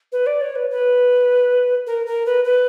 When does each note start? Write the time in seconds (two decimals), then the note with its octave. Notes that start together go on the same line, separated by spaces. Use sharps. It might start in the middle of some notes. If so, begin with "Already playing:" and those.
0.12 B4
0.26 D5
0.41 C#5
0.55 B4
0.70 B4
1.87 A#4
2.06 A#4
2.26 B4
2.44 B4